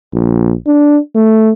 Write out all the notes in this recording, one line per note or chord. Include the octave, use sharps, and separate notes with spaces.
A#1
D4
A3